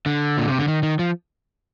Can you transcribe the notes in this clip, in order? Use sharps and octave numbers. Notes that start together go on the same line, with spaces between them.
D3
A#2
C3
D3
D#3
D#3
F3